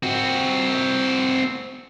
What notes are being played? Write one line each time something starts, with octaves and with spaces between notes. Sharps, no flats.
C4 F#4